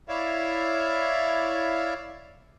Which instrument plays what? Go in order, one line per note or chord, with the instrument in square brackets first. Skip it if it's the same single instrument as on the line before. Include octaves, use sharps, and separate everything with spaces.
[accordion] E4 C#5 D5 E5 F5